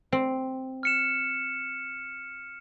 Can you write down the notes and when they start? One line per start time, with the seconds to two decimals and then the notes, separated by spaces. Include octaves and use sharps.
0.12 C4
0.83 F6 C#7 E7